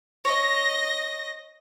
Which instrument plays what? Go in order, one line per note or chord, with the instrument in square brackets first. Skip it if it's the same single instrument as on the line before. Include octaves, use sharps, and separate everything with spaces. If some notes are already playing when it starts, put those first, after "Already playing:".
[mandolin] C#5 [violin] D#5 A#6